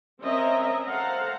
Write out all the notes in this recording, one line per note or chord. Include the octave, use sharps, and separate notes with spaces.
C4 C#4 A#4 D#5 E5 A#5
A4 C5 F5 F#5 A#5